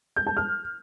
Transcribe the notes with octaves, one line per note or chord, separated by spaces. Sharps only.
G6
A5
F6